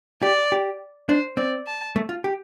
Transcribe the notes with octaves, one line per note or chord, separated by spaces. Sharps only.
G4 D5
G4
D4 C5
C4 D5
A5
A3
F4
G4